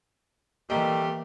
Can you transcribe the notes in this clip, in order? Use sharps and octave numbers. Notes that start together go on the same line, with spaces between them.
C3 E3 G3 A3 A#3 G4 D#5 A#5